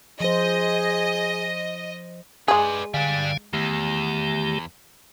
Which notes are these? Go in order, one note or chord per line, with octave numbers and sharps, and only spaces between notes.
F3 G#4 C5 D#5
G#3 G#4 B4 D5
D3 G3 D4 F5 G#5
E2 D#3 A3 G4